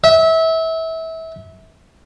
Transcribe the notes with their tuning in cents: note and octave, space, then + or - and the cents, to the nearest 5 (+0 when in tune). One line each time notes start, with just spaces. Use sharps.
E5 -25